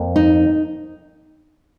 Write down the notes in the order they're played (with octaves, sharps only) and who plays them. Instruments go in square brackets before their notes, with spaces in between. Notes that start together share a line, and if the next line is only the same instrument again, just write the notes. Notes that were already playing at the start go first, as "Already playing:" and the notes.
Already playing: [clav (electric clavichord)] F2 A#3
[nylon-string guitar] D#4